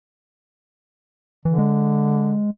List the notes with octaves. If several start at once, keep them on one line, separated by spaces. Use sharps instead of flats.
D3 E3
G#3